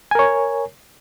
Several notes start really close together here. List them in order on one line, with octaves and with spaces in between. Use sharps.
G#5 A#4 C#5